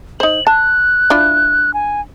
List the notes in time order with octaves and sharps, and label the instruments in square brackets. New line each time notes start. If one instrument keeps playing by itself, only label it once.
[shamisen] D#4 C5 [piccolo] F#7
[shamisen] A5 [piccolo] F#6
[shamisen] D4 E4 F4
[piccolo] G#5